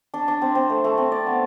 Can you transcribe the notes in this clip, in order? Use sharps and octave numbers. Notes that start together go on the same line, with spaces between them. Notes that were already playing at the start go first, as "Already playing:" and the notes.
D4
D4
C4
C4
A3
A3
C4
D5
B3